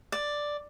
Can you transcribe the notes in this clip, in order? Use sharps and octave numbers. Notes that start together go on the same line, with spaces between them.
D5